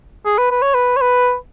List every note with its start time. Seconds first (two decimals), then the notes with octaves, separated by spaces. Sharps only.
0.26 G#4
0.38 B4
0.51 B4
0.62 C#5
0.74 B4
0.97 C#5
1.01 B4